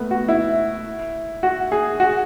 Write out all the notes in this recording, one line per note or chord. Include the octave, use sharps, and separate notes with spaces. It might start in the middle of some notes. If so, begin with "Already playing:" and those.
Already playing: A3 B3
F#4
E4
F#4
G#4
F#4